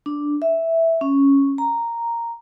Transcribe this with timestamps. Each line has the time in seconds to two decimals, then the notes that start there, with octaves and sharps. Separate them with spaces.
0.06 D4
0.42 E5
1.01 C#4
1.58 A#5